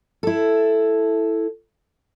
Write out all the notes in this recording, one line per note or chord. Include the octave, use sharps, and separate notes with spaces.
E4 A4